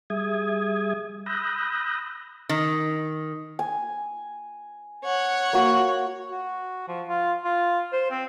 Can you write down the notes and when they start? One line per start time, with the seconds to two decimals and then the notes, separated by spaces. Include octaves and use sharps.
0.10 G3 G#4 E5 D#6 G#6
1.26 B5 D#6 E6 F#6 G6 A#6
2.49 D#3
3.59 G#5
5.04 C#5 F#5
5.53 A#3 F#4
6.31 F#4
6.88 F3
7.08 F4
7.44 F4
7.92 C5
8.11 C4